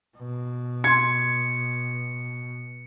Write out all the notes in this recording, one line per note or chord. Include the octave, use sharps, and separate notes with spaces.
B2
C6 G#6 C#7